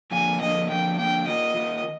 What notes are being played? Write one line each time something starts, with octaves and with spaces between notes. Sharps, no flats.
D3 F3 A#3 G#5
D3 F3 A#3 D#5
D3 F3 A#3 G5
D3 F3 A#3 G5
D#3 A#3 F4 D#5
D#3 A#3 F4